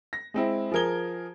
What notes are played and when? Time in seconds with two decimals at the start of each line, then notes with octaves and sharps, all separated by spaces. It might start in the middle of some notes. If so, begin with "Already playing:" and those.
0.13 A#6
0.34 G#3 C4 E4
0.72 F3 G#4 A#4 G#6 G7